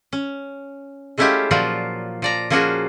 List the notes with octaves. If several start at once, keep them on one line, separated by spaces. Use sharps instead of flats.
C#4
G#3 A3 C#4 E4 F4 G4
A#2 F3 F#3 F4 D5
F3 D5 A#5
F3 A#3 C#4 F4 F#4 G#4